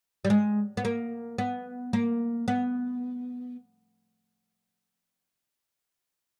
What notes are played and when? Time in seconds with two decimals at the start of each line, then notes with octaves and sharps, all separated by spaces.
0.25 G3
0.30 G#3
0.77 B3
0.85 A#3
1.38 B3
1.93 A#3
2.48 B3